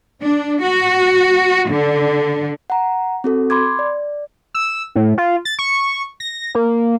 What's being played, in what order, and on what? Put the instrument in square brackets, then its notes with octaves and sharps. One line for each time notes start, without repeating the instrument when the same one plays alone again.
[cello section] D4
F#4
D3
[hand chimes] F#5 A#5
C4 F#4 A4
B5 C6 D6 G#6
D5
[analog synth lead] E6
A2
F4
A6
C#6
A#6
A#3